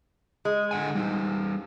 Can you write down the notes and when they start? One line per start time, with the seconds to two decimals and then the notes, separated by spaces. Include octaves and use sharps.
0.45 G#3
0.71 D3 F#5 G#5
0.95 G3 D#4